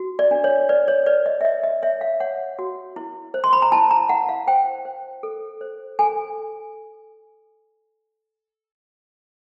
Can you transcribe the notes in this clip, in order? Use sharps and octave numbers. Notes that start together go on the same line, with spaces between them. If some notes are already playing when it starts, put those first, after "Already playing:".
Already playing: F#4
D5
D4
C#5
B4 D5
C#5
B4 D5
D#5
E5
C#5 D#5
D#5
C#5 E5
F5
C#5 F#5
F#4
E4
C5
C6
B5
A#5
E4 A5
A#5
E4 F#5
F5
C5 G5
C5
A4
C5
A4 G#5